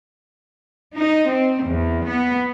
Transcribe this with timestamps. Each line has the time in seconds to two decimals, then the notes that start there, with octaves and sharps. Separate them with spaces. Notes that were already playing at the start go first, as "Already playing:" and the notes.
0.96 D#4
1.33 C4
1.66 E2
2.09 B3